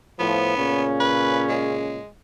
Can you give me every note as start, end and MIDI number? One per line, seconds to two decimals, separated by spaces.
0.19 0.52 45
0.19 0.52 53
0.19 0.88 59
0.57 1.99 46
0.57 1.99 49
0.57 1.99 61
1.00 1.43 71
1.49 2.07 56